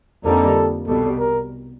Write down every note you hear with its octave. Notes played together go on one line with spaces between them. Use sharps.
F2 D3 G3 A#3 D#4 A4
C2 B2 G3 A4
A#4